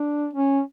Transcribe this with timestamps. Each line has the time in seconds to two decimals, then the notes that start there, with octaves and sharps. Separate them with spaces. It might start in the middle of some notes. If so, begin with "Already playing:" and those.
Already playing: D4
0.33 C#4